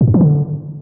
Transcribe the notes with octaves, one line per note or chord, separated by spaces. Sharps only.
A2
F#2
E3
D3